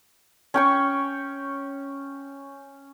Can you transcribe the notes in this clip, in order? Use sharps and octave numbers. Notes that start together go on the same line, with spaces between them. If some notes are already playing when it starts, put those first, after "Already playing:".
C#4 G5 C#6